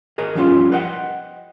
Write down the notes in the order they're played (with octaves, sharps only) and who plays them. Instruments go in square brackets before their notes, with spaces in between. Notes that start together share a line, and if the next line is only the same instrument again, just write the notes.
[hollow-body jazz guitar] G#4 A#4 D#5 A#5
F3 G3 B3 C#4 D4 F4
B4 C5 D#5 F#5 G5